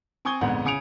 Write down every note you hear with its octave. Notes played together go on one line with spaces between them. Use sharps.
C4 G#5 C#6 D#6 G#6 G7
A#1 F2 G#2 D3 B3 F#5
C#3 G#5 D#6 C#7 D7 F7